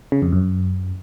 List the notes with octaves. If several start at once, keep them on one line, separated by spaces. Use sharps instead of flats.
C#3
F2
F#2